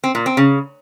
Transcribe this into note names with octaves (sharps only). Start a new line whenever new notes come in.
C4
A#2
C4
C#3